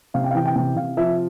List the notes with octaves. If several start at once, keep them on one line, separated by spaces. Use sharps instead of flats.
C3 F5
G5
F5
E3 G5
G5
C3 G5
C3 F5
F3 E5